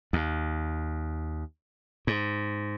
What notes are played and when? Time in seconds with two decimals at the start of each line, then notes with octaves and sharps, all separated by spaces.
0.13 D#2
2.07 G#2